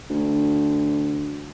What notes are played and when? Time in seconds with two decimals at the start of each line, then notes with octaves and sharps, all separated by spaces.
0.10 D2